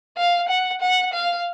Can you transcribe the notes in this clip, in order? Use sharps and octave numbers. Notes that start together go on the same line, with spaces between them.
F5
F#5
F#5
F5